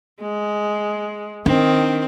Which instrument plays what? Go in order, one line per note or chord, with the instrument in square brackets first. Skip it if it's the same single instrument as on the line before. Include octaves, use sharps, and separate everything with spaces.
[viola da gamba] G#3
[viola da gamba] D#3 [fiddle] C4 [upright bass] D4